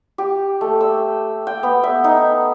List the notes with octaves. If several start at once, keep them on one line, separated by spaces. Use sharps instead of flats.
G4
A3
E6
G5
B3
E5
D#4